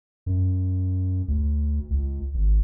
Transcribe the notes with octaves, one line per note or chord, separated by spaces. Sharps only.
F#2
D2
C#2
G#1